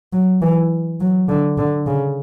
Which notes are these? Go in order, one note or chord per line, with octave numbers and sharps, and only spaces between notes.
F#3
E3
F#3
D3
D3
C#3